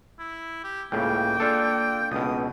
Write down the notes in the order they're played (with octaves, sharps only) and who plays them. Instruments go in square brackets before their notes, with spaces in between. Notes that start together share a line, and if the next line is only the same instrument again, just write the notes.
[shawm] E4
G4
[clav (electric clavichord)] C#2 A2 C#3 [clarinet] A#3 [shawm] G5
[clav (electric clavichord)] D4 F4 A4
[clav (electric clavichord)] C#2 B2 [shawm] D#6